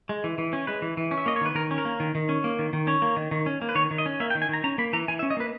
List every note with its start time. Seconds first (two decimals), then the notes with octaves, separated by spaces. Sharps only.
0.09 G#3
0.24 E3
0.38 E3
0.53 C#4
0.67 G#3 B4
0.82 E3
0.97 E3
1.11 C#4
1.18 E5
1.26 A#3 D#5
1.36 C#5
1.41 D#3 B4
1.55 D#3 A#4
1.71 C#4
1.78 A#4
1.85 A#3
2.00 D#3
2.15 D#3
2.29 C#4
2.44 A#3
2.59 D#3
2.73 D#3
2.87 C#4 C#5
3.02 A#3
3.16 D#3
3.31 D#3
3.46 C#4
3.62 A#3
3.69 B4
3.75 D#3 C#5
3.91 D#3
3.98 D#5
4.06 C#4
4.20 A#3 E5
4.30 G5
4.35 D#3
4.42 G#5
4.49 D#3 A#5
4.64 C#4 A#5
4.78 A#3 B5
4.93 E3 A#5
5.08 E3 G#5
5.19 E5
5.23 C#4
5.30 D#5
5.37 A#3 B4